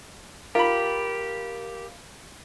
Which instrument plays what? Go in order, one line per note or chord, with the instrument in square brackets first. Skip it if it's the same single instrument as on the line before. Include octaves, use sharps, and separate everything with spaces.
[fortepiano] F4 B5 [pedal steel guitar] G4 [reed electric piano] A#4